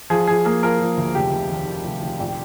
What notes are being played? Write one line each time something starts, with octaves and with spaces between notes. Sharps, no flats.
F3 G#4
F3 G#4
A#3 G#4
F3 A#4
F3
D2
F1 G4
F1
D#2
D#3
F1
F1
A#1